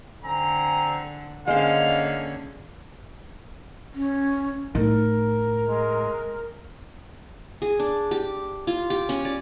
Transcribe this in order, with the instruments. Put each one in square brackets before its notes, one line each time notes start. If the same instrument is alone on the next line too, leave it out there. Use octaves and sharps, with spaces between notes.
[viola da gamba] D3 [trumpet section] C4 G#5 A#5
[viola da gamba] D3 A#3 C#4 [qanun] G#3 C5 [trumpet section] F5
[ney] C#4
[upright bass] A2 [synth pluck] D#4 [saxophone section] A#4
[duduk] G#3
[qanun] G#4
D4
G4
F4
G4
C#4
D5